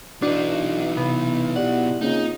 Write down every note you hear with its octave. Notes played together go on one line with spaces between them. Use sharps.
B2 E3 D4 D#4 F#4
C3 B3
E4 G4 D5 F#5
C#3 A#3 C4 D#4 F4